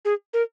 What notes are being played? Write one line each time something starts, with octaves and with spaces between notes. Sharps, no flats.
G#4
A#4